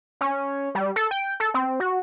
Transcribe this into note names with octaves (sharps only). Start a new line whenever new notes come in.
C#4
G3
A4
G5
A4
C4
F#4